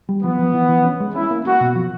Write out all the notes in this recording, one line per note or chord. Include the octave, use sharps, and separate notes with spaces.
G3
F3 B3
F3
E3
E3
C#4
G#3
C#4 E4
A#3
A#3 F#4
B2
F3